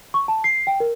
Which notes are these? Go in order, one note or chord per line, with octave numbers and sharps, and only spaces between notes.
C#6
A5
C7
G5
A#4